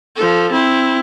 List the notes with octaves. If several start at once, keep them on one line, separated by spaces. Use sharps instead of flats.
F3 A4
C4 E4